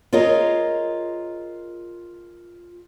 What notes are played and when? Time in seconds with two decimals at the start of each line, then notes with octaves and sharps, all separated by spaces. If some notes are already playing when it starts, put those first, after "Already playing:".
0.13 F4 G#4 A#4 C#5 D#5